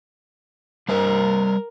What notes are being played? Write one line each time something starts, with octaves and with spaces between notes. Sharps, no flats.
G3 A#4 C5 D#5